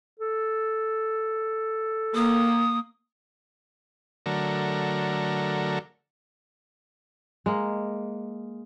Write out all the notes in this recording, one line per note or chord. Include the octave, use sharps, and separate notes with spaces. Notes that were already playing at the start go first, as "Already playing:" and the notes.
A4
A#3 D#6
D3 F#3 A3 A#4
G#3 A#3